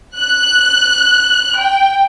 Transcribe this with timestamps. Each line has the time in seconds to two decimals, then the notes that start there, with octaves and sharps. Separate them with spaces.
0.16 F#6
1.60 G5